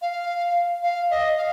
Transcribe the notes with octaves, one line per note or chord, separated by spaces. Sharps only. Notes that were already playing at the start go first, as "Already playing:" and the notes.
F5
F5
D#5
F5